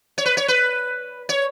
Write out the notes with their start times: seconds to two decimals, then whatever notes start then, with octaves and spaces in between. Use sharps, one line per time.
0.18 C#5
0.26 B4
0.37 C#5
0.48 B4
1.29 C#5